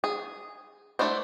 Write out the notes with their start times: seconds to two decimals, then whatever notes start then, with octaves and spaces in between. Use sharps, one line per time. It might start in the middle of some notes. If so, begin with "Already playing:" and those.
0.04 G#4
0.99 A3 D4 E4 C5